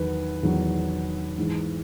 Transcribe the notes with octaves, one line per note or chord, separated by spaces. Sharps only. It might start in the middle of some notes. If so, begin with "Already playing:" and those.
Already playing: E2 D#3 F#3 B4
E2 D#3 F#3
G#2 E3 G#3